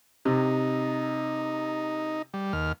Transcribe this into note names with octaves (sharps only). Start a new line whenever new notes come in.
C3 D#4
G3
D#2 F6